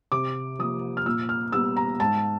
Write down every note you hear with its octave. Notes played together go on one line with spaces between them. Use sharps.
C3 D6
F3 A#3 D#6
F6
A#2 E6
F6
G3 B3 E6
A#5
G#2 A5